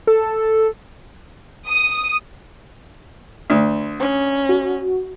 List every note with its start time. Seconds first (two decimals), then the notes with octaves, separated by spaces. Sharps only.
0.07 A4
1.68 D#6
3.50 D2
4.00 C#4
4.49 F#4